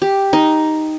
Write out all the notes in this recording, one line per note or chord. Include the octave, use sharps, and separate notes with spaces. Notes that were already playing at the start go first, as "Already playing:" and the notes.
G4
D#4